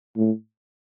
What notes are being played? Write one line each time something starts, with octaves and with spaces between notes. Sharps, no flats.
A2